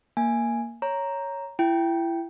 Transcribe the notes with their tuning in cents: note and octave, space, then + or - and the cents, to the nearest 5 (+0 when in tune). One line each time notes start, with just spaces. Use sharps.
A#3 +0 G#5 +0
C#5 +0 A#5 +0
E4 +30 G5 -5